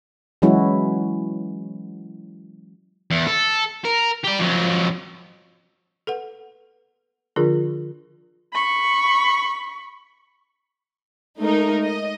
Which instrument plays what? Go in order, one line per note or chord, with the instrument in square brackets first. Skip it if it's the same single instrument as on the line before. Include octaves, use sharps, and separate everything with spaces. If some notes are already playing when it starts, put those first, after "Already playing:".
[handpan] E3 F#3 G#3 C#4 E4 F#4
[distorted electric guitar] E2
A4
A#4
G4 D5
F2 F#3
[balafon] A4 B4 F#5
D3 F3 D4 F4 G#4 A#4
[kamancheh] B5 C#6
[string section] G#3 A3 D#4 A#4
D#5